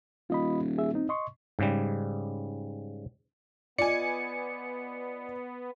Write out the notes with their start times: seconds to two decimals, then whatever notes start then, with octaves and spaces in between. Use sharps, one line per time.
0.30 D#1 F4 D#5 B5
0.78 G#4 E5
0.94 C4 D#4
1.09 D#5 C6 C#6
1.59 G#2 C#3 G3
3.78 B3 F4 D5 D#5 G#5 C#7